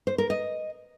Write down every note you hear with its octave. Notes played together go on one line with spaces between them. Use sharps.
C5
A#4
D#5